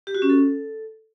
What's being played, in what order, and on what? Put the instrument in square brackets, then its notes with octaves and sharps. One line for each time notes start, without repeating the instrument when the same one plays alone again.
[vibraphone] G4
F#4
C#4
A4